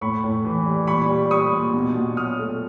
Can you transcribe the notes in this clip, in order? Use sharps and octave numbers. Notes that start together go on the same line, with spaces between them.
A2 B5 C#6
A2
E3
G3
A#2 B5 C#6
G3
G3 C#6 D#6
A#2
B2
B2
F#3 D#6 F6
A3